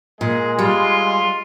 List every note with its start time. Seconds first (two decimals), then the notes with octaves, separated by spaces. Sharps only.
0.21 A#2 G#3 G#4
0.59 G3 F4